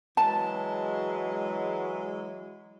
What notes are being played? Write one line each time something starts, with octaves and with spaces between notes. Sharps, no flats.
E3 F#3 G#3 A5